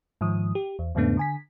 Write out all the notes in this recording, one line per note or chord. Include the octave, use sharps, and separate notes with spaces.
G#2 D#3 F3 D#6
G4
E2
E2 G#2 C#3 A3 B3 D4
D3 G#5 B6